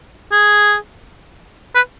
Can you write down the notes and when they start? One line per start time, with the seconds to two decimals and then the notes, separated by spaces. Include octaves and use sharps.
0.32 G#4
1.75 B4